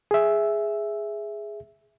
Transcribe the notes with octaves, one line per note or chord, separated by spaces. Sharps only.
G#4 E5